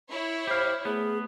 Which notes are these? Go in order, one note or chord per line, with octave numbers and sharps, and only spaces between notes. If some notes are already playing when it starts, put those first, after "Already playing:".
E4 C#5
G4 C5 F5
A3 B3 G#4